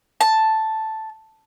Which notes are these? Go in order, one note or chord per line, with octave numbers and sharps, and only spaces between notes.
A5